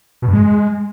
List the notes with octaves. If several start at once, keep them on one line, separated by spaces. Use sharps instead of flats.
B2
G2
G#3